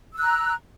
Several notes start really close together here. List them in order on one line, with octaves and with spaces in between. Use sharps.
E6 F#6 A#5